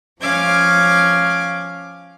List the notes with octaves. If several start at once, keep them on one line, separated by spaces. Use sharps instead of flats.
F3 C#4 F5 D6 G#6